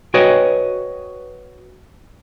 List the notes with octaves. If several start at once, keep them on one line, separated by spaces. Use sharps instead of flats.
F#4 B4 C#5 D#5 G5 G#5